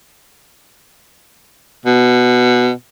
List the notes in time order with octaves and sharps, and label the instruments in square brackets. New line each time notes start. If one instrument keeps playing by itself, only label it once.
[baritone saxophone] B2